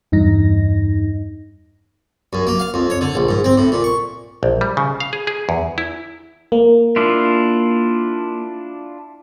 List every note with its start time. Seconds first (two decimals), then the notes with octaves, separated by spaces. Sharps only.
0.12 E2 G2 D#4 A#6
2.33 F#2
2.47 A#3
2.60 F5
2.74 F2
2.90 C#5
3.01 D3
3.15 A#1
3.29 G#2
3.44 C4
3.57 A2
3.72 A#2
3.84 C#6
4.43 A#1
4.61 G3
4.77 C#3
5.00 F5
5.13 G#4
5.27 G#4
5.49 E2
5.78 E4
6.52 A#3
6.96 D4 E4 F4